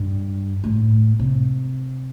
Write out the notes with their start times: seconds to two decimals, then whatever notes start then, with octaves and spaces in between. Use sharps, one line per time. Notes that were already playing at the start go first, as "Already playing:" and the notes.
Already playing: G2
0.64 A2
1.19 C3